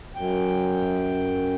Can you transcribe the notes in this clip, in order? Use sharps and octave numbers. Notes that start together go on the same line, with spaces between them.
F#2 G5